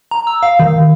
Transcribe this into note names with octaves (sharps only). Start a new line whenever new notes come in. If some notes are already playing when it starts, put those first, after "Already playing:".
A#5
E6
F5
D#3